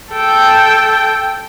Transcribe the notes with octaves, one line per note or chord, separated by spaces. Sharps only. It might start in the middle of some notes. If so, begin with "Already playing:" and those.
A4 G5